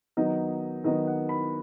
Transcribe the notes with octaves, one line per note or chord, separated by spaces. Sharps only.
D#3 F#3 B3 D#4 D#5
D#3 F#3 B3 D#4 D#5
F#5
B5